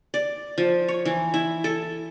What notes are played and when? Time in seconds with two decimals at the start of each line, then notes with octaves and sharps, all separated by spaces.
0.14 D5
0.58 F3
0.88 C#5
1.05 E3
1.34 E4
1.64 A4